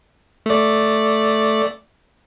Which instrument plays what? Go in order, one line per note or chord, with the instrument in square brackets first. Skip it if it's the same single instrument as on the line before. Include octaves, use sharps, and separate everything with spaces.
[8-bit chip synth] A3 D5